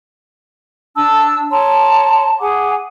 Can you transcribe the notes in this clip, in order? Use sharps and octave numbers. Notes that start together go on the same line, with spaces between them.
D4 A5 E6
C#5 A5 A#5 C6
G#4 F#5 G#5 D6